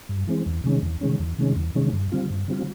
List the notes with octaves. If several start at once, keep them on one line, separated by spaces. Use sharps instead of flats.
G2
E3 G#3 C4
E2
C3 D#3 G#3 C#4
E2
C3 D#3 G#3 C#4
E2
C3 D#3 G#3 C#4
E2
C3 D#3 G#3 C#4
G2
D3 G3 C4 F4
G2
D3 G3 C4 F4